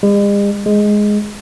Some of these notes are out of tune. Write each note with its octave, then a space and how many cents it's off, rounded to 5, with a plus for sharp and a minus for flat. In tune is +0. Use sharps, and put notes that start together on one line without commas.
G#3 -45
G#3 +5